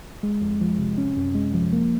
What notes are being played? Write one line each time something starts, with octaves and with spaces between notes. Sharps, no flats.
G#3
F2
F3
C3
C#4
F#2
G#3
F3
A#3